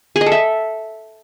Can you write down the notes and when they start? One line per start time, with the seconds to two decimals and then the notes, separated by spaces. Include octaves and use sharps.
0.16 G#4
0.21 D#5
0.26 A4
0.32 E5